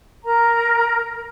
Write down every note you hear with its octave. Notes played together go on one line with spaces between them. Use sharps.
A#4 A#5